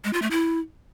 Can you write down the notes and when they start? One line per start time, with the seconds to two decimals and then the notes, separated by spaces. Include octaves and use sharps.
0.04 G#3
0.13 F4
0.22 A3
0.31 E4